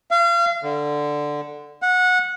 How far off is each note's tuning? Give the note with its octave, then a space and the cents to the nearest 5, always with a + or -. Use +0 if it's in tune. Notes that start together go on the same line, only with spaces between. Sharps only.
F5 -35
D3 +5
F#5 -20